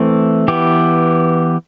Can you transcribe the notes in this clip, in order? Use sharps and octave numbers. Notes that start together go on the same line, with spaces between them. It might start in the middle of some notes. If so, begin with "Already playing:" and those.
Already playing: E3 A3 C4
E3 B3 G4